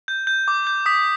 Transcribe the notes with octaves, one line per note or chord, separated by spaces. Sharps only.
G6
G6
D6
G6
D#6 B6